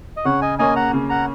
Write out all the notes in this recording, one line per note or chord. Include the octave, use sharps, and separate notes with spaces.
D#5
C#3 C#5 F#5
D#5 G#5
A#3 C#4 D#5 G#5
F#5 A#5
C#3
F#5 A#5